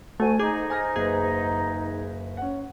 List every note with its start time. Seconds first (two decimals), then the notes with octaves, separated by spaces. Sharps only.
0.20 D2 A3 F#4 G#5
0.39 G#2 D#4 G#4 D6 G6
0.70 G#5 F6 A#6
0.96 F#1 G#4 B4
2.37 C#4 F#5